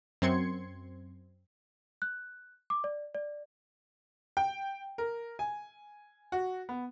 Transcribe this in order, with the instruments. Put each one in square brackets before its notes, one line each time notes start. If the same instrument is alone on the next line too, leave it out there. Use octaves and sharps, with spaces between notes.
[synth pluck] F#2 C4 C6 G#6 C#7
[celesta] F#6
D6
D5
D5
[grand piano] G5
A#4
G#5
F#4
B3